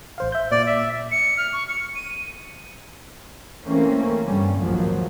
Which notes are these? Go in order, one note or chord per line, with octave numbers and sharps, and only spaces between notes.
A1 C5 F5
E5 G6
A#2 D5
E5
C#7
F6
C#6
C#7
D#7
E3 A3 A#3 C4 C#4
G2 D3 G3 C#4
A#1 D#2 G#2 F3 F#3 A#3